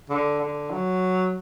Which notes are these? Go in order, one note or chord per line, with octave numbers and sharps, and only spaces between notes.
D3
D3
F#3